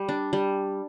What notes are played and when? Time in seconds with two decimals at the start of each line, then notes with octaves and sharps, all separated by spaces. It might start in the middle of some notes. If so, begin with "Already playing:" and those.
Already playing: G3
0.09 D4
0.33 G3